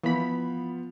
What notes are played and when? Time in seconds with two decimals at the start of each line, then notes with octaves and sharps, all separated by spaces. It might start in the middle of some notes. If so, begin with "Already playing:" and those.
0.03 E3 F3 B3 F4 B5